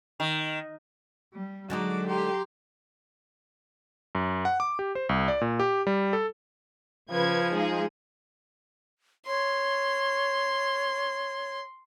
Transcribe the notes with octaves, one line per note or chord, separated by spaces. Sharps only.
D#3
G3
D3 F#3 G#3 D#4 F#4 D6
G4 A#5 C6
F#2
F#5
D6
G4
C5
C2
D5
A#2
G4
G3
A4
C#3 F3 B4 G#6
G#3 D#4 G#4
C#5 C6